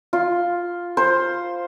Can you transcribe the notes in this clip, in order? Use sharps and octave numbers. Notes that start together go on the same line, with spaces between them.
F4
C5